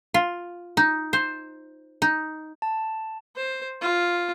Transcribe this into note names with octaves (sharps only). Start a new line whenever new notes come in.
F4
D#4
C5
D#4
A5
C5
F4